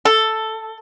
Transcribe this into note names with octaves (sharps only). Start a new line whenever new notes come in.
A4